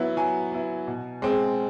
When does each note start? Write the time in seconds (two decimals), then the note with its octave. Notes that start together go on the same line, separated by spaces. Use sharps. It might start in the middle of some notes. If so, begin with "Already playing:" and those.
Already playing: F#3 B3 E4
0.17 F#3 G#5
0.52 B3 E4
0.87 B2
1.22 G#3 C4